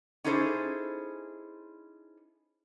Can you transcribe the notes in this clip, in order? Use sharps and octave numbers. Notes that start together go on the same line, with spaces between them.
C#4 D#4 E4 G#4 A4 C5